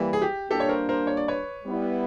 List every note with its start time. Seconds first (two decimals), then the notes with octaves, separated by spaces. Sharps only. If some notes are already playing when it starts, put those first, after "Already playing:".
Already playing: E3 G3 A#3
0.13 G#4
0.22 G4
0.50 A#2 G3 A#3 D4 G4 A4
0.60 C#5
0.69 A#4 C5
0.89 A#4 C5
1.07 C#5
1.17 D5
1.28 B4 C#5
1.64 G3 B3 E4